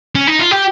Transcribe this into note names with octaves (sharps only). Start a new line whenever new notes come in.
C#4
D#4
F4
G4